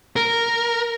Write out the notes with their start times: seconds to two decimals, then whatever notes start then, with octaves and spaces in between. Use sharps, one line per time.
0.16 A#4